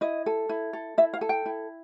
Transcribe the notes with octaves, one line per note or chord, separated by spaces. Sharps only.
E4 D#5
A4
E4
A4
E4 E5
F5
A4
G5
E4